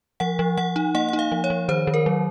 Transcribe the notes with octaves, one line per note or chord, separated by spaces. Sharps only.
F3 F#5
F3
F3 F#5
D#4
A#3 F#5
D#4 F#5
F5
F3
C#5
F3
D#3 C5
D#3
A#4
F#3